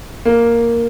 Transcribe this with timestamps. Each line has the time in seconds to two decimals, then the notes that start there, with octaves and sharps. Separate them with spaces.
0.25 A#3